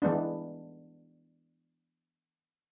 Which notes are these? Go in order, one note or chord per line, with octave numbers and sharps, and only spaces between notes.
E3 G#3 B3 D4